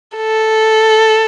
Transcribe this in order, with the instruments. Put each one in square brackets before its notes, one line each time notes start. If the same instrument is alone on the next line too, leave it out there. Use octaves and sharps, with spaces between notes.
[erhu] A4